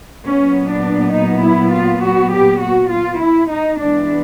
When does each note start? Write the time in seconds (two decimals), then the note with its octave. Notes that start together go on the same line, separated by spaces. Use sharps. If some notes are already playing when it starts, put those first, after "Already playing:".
0.25 A#2 F#3 B3 C#4
0.70 D4
1.15 D#4
1.43 E4
1.73 F4
2.03 F#4
2.32 G4
2.62 F#4
2.92 F4
3.20 E4
3.51 D#4
3.80 E3 G#3 B3 D4